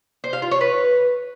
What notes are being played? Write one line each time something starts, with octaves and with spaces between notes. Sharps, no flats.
C5
F5
F4
C#5
B4